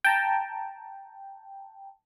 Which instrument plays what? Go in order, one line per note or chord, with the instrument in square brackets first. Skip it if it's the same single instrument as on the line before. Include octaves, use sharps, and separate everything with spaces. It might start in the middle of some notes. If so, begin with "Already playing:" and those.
[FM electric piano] G5 A5 A#5